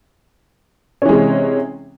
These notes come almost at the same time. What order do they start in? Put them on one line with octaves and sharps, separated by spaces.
C#4 E3 G#3 C3